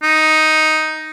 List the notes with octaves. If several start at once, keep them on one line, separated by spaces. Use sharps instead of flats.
D#4